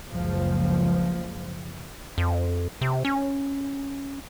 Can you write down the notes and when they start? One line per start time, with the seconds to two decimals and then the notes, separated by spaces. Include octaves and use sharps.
0.11 F#1 C#2 F3
2.18 F2
2.81 C3
3.05 C#4